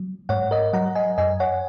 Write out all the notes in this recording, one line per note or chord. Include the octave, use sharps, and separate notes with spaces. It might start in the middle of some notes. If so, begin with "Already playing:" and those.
Already playing: F#3
G#2 C#5 F#5
A#4 D#5
F#3 F#5 A#5
D#5 G#5
F#2 D#5 G#5
C#5 F#5